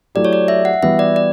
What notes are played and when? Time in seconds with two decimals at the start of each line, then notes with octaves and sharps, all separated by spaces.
0.15 F#3 A3 E4 G4 D5
0.25 C#5
0.33 D5
0.48 E5
0.65 F#5
0.82 E3 G3 B3 F#4 E5
0.99 D5
1.16 D5